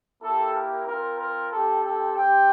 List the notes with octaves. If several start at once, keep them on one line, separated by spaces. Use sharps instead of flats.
A#3 E4 G4 A4
A#4
C4 F4 A#4
A#4
C4 G4 A4
A4
C4 G4 G5